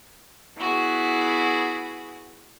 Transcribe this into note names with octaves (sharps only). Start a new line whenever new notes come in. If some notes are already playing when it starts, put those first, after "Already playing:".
B3 E4 F#4 G#4